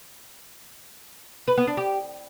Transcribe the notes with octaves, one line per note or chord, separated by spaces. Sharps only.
B4
B3
D4
G4